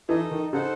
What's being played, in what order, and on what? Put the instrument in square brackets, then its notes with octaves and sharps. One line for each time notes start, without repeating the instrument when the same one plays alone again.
[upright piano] E3 [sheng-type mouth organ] D#4 A4 D#5
[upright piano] D#3
[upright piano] C#3 [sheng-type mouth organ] D#4 A4 C5 F#5